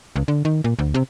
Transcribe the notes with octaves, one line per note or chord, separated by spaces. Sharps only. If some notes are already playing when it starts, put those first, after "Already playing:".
C#2
D3
D#3
A#2
D2
C3